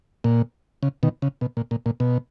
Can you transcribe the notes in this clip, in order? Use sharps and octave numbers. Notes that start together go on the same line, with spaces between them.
A#2
C#3
B2 D#3
C#3
B2
A#2
A#2
A#2
B2